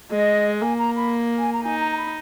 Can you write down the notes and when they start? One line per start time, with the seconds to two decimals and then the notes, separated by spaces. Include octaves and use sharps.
0.11 G#3 D#5
0.62 A#3 G#5
0.79 A#5
0.96 B5
1.38 G#5
1.53 A#5
1.64 D#4 G#5
1.80 A#5
1.92 A#5
1.97 B5